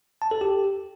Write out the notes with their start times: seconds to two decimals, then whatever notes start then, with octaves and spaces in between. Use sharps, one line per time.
0.22 A5
0.31 A4
0.41 G4